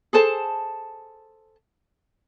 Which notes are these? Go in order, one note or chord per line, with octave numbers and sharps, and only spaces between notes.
G#4 A4 C5 A5